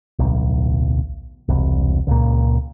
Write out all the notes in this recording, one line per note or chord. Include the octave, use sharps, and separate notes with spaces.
D1 B1
E1 C2
C#2 A#2